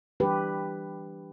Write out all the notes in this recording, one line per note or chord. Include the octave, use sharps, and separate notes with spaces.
E3 G3 D4 G4 B4